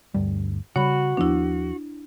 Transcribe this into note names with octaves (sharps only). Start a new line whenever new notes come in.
D2 G2 G3
C#3 G3 F#4 C#5 B5
D#2 F3 B3 D4 E4